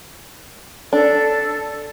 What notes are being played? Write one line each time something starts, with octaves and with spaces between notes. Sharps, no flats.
D4 A4